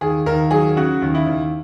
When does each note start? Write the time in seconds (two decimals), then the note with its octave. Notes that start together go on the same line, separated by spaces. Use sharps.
0.01 D#2 G#4
0.26 D#2 A#4
0.51 F#3 G#4
0.76 C#3 F#4
1.02 D#2
1.15 E4
1.27 D#2